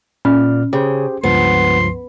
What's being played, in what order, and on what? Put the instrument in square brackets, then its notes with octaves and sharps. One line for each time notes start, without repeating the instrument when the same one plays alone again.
[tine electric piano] A#2 D5 F6 [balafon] C#4
[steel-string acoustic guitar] C#3 [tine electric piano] G4 G#4 C5
[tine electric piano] C#2 G2 F3 [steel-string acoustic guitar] B3 [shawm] C6